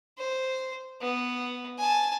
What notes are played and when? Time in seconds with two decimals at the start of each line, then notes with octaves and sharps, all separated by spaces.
0.17 C5
1.01 B3
1.78 G#5 A5